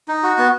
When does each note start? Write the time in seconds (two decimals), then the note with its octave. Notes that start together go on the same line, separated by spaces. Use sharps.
0.08 D#4
0.23 F#4
0.38 B3